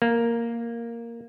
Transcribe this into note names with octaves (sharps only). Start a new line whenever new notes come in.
A#3